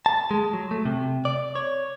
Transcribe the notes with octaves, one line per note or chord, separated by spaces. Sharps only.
A5
G#3
F#3
A3
C3
D5
C#5